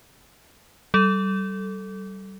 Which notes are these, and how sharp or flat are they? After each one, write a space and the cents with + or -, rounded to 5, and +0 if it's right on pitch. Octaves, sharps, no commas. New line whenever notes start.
G3 -30 A4 +0